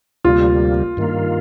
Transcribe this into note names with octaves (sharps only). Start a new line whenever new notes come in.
D2 C3 G3 A#3 F4
G2 D#3 A#3 F4